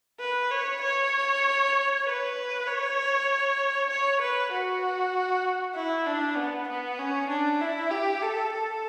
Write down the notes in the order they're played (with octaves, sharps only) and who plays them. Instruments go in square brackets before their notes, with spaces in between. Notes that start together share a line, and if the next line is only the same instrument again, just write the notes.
[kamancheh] B4
C#5
C#5
B4
C#5
C#5
B4
F#4
E4
D4
B3
B3
C#4
D4
E4
G4
A4
A4